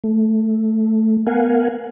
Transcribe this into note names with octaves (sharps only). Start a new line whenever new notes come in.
A3
B3 A#4 F5 F#5 G#5